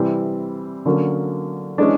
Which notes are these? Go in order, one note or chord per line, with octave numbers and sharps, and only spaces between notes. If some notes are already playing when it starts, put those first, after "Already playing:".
Already playing: C3 E3 G3 C4
D3 F#3 A#3 C#4
E3 G#3 C#4 D4